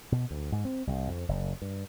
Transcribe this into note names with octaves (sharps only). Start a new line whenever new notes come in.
B2
D2
G#2
C4
C2
F2
F#1
G2